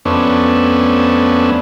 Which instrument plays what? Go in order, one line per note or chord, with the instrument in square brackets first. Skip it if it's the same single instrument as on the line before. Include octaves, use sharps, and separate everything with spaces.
[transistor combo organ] F2 A3 B3 C#4 D4